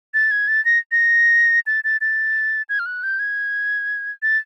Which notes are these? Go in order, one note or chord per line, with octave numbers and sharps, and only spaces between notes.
A6
G#6
A6
A#6
A#6
A6
A6
A6
G#6
F6
F#6
G6
G#6
A6